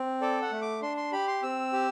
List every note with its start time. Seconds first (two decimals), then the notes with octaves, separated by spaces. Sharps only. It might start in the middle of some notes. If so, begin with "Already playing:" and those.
Already playing: C4
0.21 A4 D5
0.42 F#5
0.52 A3
0.62 D6
0.82 D4 C6
0.97 C6
1.12 G4 B5
1.28 C6
1.43 C4 E6
1.73 G4